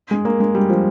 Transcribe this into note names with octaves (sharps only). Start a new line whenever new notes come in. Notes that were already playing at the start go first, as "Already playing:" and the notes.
G#3
A#3
G#3
G3
F3